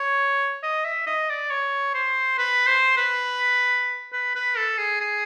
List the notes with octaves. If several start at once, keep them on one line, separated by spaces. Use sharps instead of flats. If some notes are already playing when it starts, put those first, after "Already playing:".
Already playing: C#5
D#5
E5
D#5
D5
C#5
C5
B4
C5
B4
B4
B4
A4
G#4
G#4